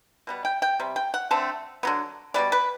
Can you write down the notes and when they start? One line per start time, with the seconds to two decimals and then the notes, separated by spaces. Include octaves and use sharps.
0.27 B2 G3 B3
0.45 G5
0.62 G5
0.80 C3 G3
0.96 G5
1.14 F#5
1.31 D3 A3 C4 A5
1.83 D3 F#3 B3
2.34 B2 G3 B3 D5
2.52 B4